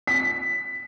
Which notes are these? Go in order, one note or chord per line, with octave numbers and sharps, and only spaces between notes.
B6